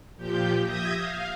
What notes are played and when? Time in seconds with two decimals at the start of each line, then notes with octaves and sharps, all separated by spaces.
0.17 A#2 F3 G4 G5
0.64 E5 D#6 G6 G#6 A#6
0.96 F5